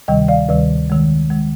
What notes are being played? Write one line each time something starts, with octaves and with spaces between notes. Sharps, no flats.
D2 C3 D#3 G3 D#5 G5
D5 F5
D2 C3 D#3 G3 B4 D5
F2 D#3 G#3
D#3 G#3